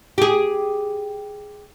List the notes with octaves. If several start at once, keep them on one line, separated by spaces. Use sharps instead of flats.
G4 G#4